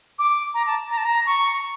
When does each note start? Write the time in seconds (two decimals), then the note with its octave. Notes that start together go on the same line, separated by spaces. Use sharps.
0.19 D6
0.54 A#5
0.67 A5
0.90 A#5
0.97 A5
1.05 A#5
1.26 C#6